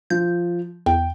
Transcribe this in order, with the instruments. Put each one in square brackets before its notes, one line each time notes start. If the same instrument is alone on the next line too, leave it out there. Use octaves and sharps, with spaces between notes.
[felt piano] F3 [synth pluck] G6
[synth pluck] E2 [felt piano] G5